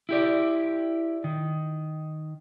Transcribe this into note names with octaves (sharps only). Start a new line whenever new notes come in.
E4 G4 D5
D#3